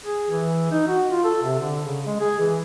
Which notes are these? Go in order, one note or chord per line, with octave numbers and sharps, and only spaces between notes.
G#4
E3
D#4
F#4
F4
A4
C3
D3
C#3
G#3
G#4
E3